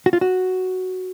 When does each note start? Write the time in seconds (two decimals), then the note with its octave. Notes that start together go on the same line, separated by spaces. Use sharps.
0.06 F#4
0.13 F4
0.21 F#4